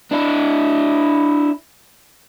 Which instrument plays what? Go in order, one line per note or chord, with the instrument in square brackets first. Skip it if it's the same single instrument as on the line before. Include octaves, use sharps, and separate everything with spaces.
[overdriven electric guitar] D4 E4